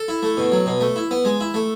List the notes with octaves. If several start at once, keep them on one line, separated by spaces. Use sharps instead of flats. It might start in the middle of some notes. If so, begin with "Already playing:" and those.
Already playing: A4
E4
A3
B2
F#3
B2
A3
E4
B3
G#3
E4
A3